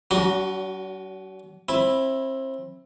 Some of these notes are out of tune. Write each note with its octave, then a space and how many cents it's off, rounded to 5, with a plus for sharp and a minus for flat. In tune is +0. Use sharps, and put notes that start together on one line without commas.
F#3 +40 D4 -45 F#4 +0
C4 +30 E4 +0